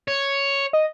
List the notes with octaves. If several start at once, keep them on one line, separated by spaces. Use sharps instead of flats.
C#5
D#5